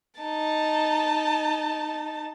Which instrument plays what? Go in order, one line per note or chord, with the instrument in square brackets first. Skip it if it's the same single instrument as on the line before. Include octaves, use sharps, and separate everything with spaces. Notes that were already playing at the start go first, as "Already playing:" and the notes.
[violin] D#4 A5